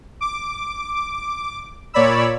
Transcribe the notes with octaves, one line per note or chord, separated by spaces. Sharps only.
D6
A#2 C#5 D5 B5 E6